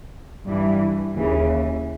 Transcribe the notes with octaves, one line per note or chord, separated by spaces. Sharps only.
G2 E3 G3
D#2 C#3 E3